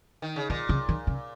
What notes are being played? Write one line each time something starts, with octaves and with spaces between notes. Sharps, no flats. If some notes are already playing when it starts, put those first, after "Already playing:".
D#3
C#3
A#2 D#3
C#3
D#3
C#3